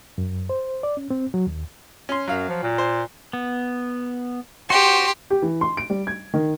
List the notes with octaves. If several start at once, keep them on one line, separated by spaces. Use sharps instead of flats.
F#2
C5
D5
C#4
C4
F#3
D#2
C#4 C6
F#2 F#3 F5
F3
A#2
C5
B3
F#4 G4 C5 C6
G4
E3
C6
D7
G3
G#6
D#3